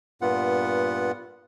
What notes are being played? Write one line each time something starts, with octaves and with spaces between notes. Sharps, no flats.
G2 A#2 B3 F4 F#5